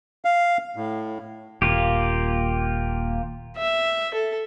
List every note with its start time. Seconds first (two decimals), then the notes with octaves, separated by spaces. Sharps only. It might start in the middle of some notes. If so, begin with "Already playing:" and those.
0.25 F5
0.76 A2
1.62 D#1 A#3 F4 G4
3.57 E5
4.14 A4